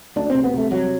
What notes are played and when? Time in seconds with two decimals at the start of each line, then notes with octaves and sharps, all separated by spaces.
0.16 D2 D4
0.30 C3 C4
0.44 B3
0.54 C3 A3
0.71 C2 F#3